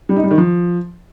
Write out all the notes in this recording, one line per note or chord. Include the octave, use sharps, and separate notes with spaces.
G3
D#4
G3
D#3
F3